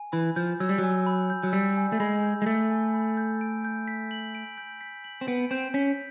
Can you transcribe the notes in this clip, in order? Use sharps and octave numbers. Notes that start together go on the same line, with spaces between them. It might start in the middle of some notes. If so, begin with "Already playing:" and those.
Already playing: G#5
E3 B5
F3 G6
F#3 E6
G3
F#3
G#5
B5
G6
F#3
G3 E6
G#5
A3
G#3 B5
G6
G#3
A3 E6
G#5
B5
G6
D7
G6
B6
F#7
D7
G6
B6
F#7
C4
B3 D7
C4 G6
C#4 B6